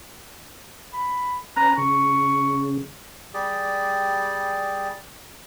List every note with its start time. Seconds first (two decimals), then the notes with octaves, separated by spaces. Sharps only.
0.93 B5
1.57 C#4 B4 A#5
1.78 C#3 C#6
3.34 G3 G4 G#4 D5